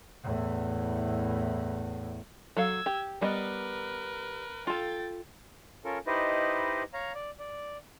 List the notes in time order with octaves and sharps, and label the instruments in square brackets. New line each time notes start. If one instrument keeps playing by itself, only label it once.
[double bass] E2 A2
[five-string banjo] F#3 A4 F5 [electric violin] E6 G#6
[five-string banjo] G4
[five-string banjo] G3 B3 D#5 [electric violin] A#4 B4
[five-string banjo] F4 A4 [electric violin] G5 A6
[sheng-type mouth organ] C#4 F4 A4 A#4
D#4 E4 G4 B4 C5 D#5
C#5 F5 A#5
D5
D5